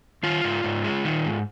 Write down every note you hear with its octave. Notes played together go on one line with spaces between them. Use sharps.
D#3 F4
G#2
G#2
G#3
D#3
G#2